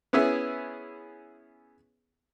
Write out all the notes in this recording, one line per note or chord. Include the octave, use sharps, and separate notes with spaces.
B3 C#4 E4 G#4 E5